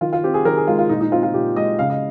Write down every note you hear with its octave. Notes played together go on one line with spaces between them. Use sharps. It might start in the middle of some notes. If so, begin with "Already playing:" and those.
D#3 F4
F4
C4 G4
G#4
D#3 A#4
G#4
G#3 F4
F4
A#2 D#4
D#4
C4 F4
F4
A#2 G4
G#3 D#5
C#3 F5
D#5